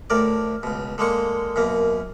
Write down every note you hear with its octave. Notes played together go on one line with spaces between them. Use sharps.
D2 A2 A#4 D5
C#2 B2
D3 G#3 A#3 C#6
F#2 B2 A#3